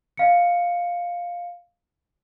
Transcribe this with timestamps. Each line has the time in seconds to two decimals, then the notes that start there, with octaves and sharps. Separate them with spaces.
0.17 D#5 F5 C#7